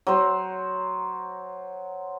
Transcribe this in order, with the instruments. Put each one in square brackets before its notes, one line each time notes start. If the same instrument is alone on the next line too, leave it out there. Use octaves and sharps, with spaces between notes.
[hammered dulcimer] F#3 C5